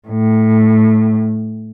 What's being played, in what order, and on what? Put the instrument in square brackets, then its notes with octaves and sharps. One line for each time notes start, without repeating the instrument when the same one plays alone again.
[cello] A2